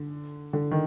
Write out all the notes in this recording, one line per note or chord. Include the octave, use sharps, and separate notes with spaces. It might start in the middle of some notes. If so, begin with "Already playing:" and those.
Already playing: D3
D3
D#3